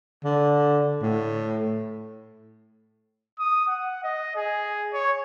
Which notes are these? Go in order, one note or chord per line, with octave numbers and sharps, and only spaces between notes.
D3
A2
D#6
F#5
D#5
G#4
C#5